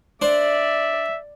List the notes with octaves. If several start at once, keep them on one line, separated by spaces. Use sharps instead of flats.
D4 C5 D5 E5